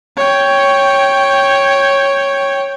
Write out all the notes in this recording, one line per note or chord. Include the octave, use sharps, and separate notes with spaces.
C#5 G5